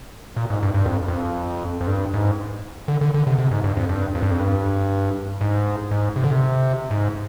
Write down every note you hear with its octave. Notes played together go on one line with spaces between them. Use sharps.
A#2
G#2
G2
G2
F2
F2
F2
G2
G#2
D3
D3
D3
C3
C3
G#2
G2
F2
G2
F2
G2
F2
G2
G#2
G#2
C3
D3
C3
G#2